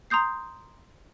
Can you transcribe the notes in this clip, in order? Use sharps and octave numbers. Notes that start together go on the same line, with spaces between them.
A#5 C6 D#6 G6 C7